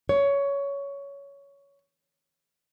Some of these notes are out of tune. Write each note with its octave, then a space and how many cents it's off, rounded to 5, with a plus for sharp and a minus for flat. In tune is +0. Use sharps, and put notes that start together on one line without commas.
C#5 +15